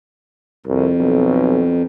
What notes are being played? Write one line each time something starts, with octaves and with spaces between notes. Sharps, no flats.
C2 F2
B1